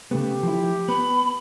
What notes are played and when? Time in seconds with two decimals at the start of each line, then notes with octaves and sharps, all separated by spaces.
0.11 C#3 A3 B3 G4
0.43 F3 E4
0.88 B3 B5